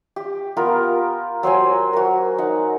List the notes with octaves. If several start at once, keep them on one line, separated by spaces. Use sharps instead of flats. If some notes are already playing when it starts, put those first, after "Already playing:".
G4
B3 F4 A#4
F#3 C5 G5 G#5
F#4 A#4
D#4 F#5